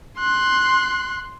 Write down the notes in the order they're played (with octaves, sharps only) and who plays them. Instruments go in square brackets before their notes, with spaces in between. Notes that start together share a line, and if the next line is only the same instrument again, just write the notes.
[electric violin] C6 F#6